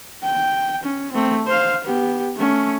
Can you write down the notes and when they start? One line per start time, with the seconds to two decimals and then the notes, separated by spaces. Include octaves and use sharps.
0.23 G5
0.83 C#4
1.12 A3 C4
1.46 C5 F5
1.84 B3 G4
2.37 A3 C#4